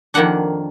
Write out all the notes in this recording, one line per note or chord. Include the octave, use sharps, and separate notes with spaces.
F2 D#3 A#3 D4 F#5